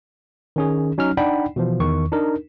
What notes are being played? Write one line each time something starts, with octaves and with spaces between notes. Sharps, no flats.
D#3 C#4 G#4
F#3 C#4 D#4 F6
D4 D#4 D5 F#5 G5 B5
B2 E3 F3
E2 D#3 C#6
D4 D#4 A#4